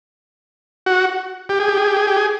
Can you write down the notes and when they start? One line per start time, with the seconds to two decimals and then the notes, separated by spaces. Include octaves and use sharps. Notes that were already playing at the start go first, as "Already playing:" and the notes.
0.86 F#4
1.49 G4
1.60 G#4
1.68 G4
1.77 G#4
1.87 G4
1.97 G#4
2.07 G4
2.17 G#4